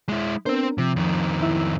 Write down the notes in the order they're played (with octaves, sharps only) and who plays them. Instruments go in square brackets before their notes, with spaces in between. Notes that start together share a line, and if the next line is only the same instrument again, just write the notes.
[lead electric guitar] G#3 E4
[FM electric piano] B3 D4 A#4 [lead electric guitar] C4 C5
[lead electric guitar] C3 [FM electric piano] F3
[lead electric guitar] F2 D#3
[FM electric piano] E4 E5 E6